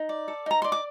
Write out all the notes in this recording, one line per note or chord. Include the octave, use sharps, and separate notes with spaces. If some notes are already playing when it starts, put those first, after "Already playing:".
Already playing: D#4
D5
A4
D#4 A#5
D5 C6
D6